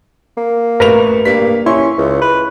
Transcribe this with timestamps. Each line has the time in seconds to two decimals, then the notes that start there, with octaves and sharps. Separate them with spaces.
0.37 A#3
0.80 A1 A3 A#4 B4 F7
1.25 G2 A#3 B6
1.66 C#4 E4 C6 C#6
1.98 C#2
2.21 B4